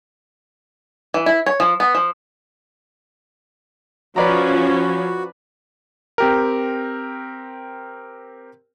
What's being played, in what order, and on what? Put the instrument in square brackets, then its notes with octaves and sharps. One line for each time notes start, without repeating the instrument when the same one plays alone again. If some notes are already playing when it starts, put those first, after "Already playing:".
[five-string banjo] E3
E4
C#5
F3
B3
F3
[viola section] F3 C#4 [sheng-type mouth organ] F#4 [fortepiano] B4 D5 A#5
[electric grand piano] C4 G4 A#4